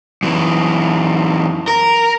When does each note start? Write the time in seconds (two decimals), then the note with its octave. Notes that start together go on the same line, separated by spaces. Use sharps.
0.23 F#2 E3
1.68 A#4